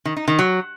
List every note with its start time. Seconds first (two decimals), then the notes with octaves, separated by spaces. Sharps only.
0.05 D#3
0.17 D#4
0.28 D#3
0.39 F#3